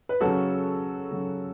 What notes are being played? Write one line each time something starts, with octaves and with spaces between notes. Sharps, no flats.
B4
C#3 F#3 F#4 A4
C#3 F#3